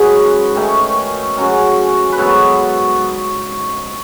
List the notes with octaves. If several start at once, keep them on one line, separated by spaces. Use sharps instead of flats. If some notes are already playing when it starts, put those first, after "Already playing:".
Already playing: G#2 F#3 C#4 G#4 B4
D#3 A3 C#4
C#3 F#3 C#4
B4
G#2 F#3 B3 A4 C#5